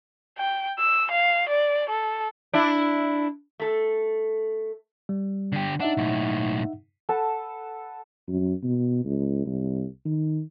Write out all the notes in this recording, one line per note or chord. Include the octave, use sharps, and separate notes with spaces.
G5
E6
F5
D5
A4
D4 E4
A3 A4
G3
D3 G4
D4 D#4 E5 F#5
B1 A2
A4 B4 F#5 A5
F#2
B2
C#2
C2
D#3